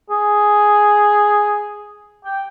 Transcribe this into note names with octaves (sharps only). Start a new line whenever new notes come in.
G#4
G5